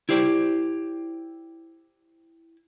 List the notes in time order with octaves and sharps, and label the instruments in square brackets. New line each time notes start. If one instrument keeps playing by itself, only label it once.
[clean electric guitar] E4 G4 C5 D5